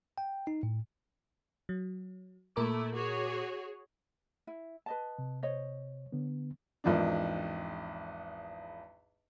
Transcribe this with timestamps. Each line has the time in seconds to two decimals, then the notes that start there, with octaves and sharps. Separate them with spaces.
0.18 G5
0.47 D#4
0.63 A2
1.69 F#3
2.56 A#2 A3 E4 A#4 D6
2.95 F#4 G#4 C#5
4.47 E4
4.86 B4 D#5 A5
5.18 C3
5.43 C5 C#5 D#5
6.12 D3 B3
6.84 G#1 E2 F3 D4